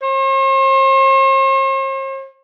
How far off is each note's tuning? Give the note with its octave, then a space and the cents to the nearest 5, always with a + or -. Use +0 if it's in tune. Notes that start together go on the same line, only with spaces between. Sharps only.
C5 +45